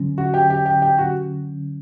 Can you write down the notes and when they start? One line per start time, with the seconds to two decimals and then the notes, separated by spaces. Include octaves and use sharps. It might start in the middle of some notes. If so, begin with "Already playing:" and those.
Already playing: D3 F#3 C#4
0.18 F#4
0.34 G4
0.50 G4
0.66 G4
0.82 G4
0.98 F#4